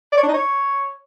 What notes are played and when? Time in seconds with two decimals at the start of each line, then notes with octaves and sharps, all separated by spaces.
0.12 D5
0.18 C#5
0.23 D4
0.29 D#4
0.34 C#5